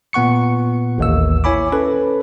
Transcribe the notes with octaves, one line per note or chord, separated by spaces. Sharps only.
A#2 B3 F#5 C#6 C#7
A1 D#2 E6
E4 C#5 G#5 B5 D6
C#4 A4 B4